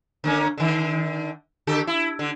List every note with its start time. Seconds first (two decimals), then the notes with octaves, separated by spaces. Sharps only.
0.24 D3 A#3 C#4
0.58 D3 D#3
1.67 D3 G4 A4
1.87 E4
2.19 D3